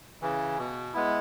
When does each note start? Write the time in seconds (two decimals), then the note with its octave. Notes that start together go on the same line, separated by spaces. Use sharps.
0.22 C#3 E3
0.58 B2
0.94 G#3 B3 E4